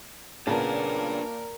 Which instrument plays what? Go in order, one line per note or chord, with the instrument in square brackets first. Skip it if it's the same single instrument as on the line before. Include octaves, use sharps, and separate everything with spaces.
[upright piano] A#2 C#5 A5 [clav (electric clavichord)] C#3 B3 [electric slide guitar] D4 B4 [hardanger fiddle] A#4